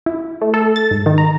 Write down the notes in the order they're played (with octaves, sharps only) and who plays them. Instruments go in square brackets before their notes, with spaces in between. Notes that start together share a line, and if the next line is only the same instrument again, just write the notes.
[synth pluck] E4
A3
A4
A6
G#2
D#3
A#5